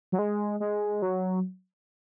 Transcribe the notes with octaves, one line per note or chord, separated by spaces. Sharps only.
F#3
G#3
G#3
F#3